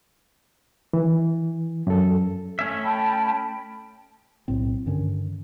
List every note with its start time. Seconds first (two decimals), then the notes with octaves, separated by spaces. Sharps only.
0.93 E3
1.87 F#2 A4
2.59 A3 C#4 E5
2.84 G5 A5 B5
4.48 B1 A2 C4
4.86 G2 D3 D#3 C#4